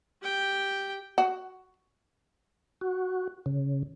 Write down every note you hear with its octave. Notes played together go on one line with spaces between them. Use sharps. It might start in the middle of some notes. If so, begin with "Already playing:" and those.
G4 G5
F#4
F#4
C#3